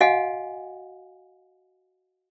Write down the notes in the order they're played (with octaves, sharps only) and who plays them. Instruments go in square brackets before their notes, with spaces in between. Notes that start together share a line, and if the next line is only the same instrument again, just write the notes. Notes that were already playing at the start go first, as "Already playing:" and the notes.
[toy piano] F#4 D#5 F5 F#5 G#5